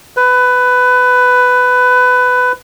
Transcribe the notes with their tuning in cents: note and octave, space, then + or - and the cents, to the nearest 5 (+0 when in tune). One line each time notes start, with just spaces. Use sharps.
B4 +15